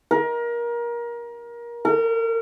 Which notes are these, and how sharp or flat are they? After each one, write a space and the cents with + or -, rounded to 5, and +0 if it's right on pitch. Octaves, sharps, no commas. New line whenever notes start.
A#4 +25
A#4 -35